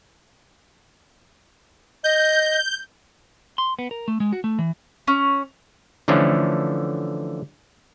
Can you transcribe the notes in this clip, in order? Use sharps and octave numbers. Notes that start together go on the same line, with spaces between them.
D#5 G6
C6
B3
A#4
A3
G#3
F#4
A3
E3
C#4
D3 E3 F3 A3 C#4